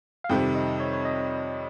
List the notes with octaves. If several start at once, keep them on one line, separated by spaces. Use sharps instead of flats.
F5
F2 C3 D#3 G3 G5
D#5
C#5
C#5
D#5